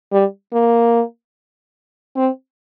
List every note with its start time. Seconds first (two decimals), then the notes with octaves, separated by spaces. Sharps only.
0.12 G3
0.53 A#3
2.16 C4